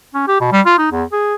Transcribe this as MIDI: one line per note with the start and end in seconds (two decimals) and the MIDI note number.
0.14 0.24 61
0.28 0.39 67
0.41 0.49 47
0.52 0.61 55
0.66 0.76 65
0.78 0.92 63
0.92 1.04 40
1.13 1.35 68